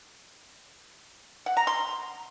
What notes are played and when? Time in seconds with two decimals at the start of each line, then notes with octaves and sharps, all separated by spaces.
1.46 F#5
1.57 A#5
1.67 C6